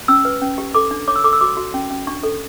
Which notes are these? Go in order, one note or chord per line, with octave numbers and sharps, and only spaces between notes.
C#4 E6
B4
C#4
G4
A4 D6
D4
C#5 D6
E6
A4 D6
E6
F#4 D6
F#4
C#4
C#4
D4 C#6
A4